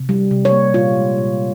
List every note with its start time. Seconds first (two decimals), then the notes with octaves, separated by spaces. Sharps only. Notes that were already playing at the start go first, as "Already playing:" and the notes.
Already playing: C3
0.09 G3
0.31 C3
0.45 C#5
0.52 A#3
0.74 A#2 F4
0.96 G#3
1.18 A#2